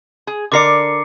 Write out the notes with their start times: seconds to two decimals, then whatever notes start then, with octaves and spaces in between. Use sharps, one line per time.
0.27 G#4
0.52 D3 A#4 D5 D6 C7 C#7